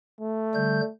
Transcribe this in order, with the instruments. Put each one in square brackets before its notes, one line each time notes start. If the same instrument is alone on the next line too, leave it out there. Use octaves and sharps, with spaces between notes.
[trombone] A3
[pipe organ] D3 G3 G6